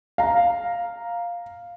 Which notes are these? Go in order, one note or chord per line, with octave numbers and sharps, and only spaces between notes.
F5 A#5